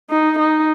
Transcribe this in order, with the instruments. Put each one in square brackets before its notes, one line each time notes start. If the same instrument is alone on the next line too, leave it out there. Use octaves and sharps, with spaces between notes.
[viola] D#4
D#4